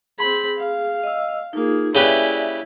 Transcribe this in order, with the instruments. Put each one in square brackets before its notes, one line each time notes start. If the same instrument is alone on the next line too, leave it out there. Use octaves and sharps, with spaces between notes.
[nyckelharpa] C4 B5 [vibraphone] G#4
[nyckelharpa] F5
[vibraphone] D#5 E6
[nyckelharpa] A#3 G#4 [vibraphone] D#4 F4
[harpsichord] C#3 G4 B4 [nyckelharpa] E4 [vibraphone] D5 E5 G#5